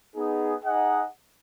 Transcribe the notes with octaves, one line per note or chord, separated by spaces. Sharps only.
B3 D#4 G#4
D#4 G#4 D#5 F#5